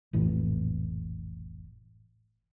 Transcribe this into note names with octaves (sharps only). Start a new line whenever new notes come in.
F1 A#1 A2 E3